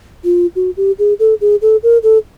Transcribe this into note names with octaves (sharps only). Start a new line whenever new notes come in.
F4
F#4
G4
G#4
A4
G#4
A4
A#4
A4